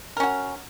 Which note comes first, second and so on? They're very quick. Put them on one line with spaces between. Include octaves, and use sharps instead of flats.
A#4 C#4 F#4